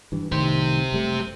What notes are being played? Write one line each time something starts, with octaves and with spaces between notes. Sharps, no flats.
G2 E3
C2 A2 D#3 G4 C5
F#1 G3 A3